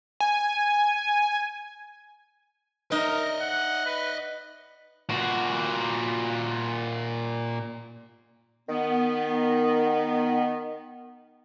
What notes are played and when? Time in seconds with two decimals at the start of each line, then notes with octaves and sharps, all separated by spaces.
0.20 G#5
2.92 D#4 A#4 D#5 E5
3.41 F#5
3.86 B4
5.09 A#2 F#4
8.68 D#3 B3